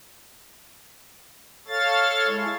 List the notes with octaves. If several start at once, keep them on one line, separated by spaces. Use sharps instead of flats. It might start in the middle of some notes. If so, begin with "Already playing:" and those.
A4 C#5 F5 A6
G#3 E4